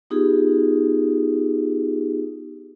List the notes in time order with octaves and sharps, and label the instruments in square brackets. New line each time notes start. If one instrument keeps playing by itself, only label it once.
[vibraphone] B3 D#4 F4 G4 G#4